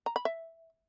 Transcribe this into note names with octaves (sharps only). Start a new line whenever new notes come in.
A#5
B5
E5